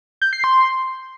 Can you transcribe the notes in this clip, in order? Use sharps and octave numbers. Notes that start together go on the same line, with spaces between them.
G6
C7
C6